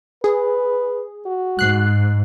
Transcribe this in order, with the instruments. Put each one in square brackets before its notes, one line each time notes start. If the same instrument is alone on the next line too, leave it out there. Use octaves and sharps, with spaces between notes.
[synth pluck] G#4 [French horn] B4
[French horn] F#4
[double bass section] G#2 [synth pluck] F#6 C7